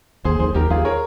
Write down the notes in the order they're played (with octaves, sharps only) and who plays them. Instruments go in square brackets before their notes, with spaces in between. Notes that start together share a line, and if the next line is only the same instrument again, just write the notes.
[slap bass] D#2 [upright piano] G#4 C5
[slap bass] D#2 [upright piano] G#4 C5
[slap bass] D#2 [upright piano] G4 A#4
[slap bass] D#2 [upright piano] F4 G#4
[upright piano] A#4 C#5